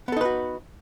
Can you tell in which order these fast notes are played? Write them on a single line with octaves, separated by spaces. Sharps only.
B3 A4 D#4 B4 F#4